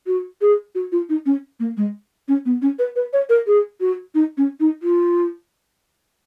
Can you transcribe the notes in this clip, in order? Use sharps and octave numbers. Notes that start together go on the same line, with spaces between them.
F#4
G#4
F#4
F4
D#4
C#4
A#3
G#3
C#4
B3
C#4
B4
B4
C#5
A#4
G#4
F#4
D#4
C#4
D#4
F4